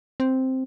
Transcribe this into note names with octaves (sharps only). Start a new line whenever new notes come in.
C4